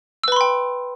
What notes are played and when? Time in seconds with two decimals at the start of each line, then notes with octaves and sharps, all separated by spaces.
0.24 E6
0.28 B4
0.32 B5
0.36 C6
0.41 G5